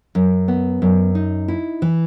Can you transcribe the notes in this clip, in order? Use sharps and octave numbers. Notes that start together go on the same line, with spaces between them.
F#2
B3
F#2
D#4
E4
E3